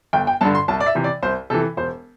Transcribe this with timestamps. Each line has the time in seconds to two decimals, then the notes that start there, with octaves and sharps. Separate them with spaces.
0.13 G1 G5
0.27 G5
0.41 G2 D3 A5
0.55 C6
0.68 C2 A5
0.80 D5
0.86 E5
0.95 C3 E3
1.04 D5
1.23 C2 C5
1.50 C3 E3 A4
1.77 E1 C5